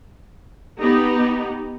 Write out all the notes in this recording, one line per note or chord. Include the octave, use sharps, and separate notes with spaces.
B3 D#4 G4